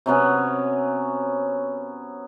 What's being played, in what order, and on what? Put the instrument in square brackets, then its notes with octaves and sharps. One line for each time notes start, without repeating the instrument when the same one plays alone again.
[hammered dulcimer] C3 F#3 B3 C#4